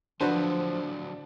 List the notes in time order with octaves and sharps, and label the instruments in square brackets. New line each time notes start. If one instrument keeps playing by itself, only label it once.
[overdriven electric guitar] D3 F#3 [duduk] F3 [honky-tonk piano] D4 [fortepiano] F#4 B4 C5